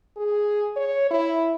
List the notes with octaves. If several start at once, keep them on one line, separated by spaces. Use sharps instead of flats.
G#4
C#5
E4